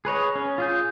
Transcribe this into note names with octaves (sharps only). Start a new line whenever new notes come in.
G#4 B4 C#5 D#5
C#4
F4 G#4 G6